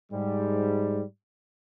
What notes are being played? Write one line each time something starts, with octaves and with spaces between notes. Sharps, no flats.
G#2 G3